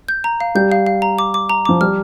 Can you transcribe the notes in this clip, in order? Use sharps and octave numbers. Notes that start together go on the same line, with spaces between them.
G6
A#5
F5
G3 G6
F5
F5
A#5
D6
D6
A#5
F3 D6
G3 F6